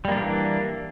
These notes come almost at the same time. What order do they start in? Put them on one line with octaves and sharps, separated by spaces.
G3 A#3 D4 E3